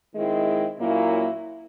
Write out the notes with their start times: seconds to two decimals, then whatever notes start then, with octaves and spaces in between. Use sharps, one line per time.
0.16 D#3 G#3 C4 E4
0.80 A#2 F#3 A#3 C#4 E4